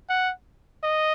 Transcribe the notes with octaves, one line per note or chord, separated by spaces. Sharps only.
F#5
D#5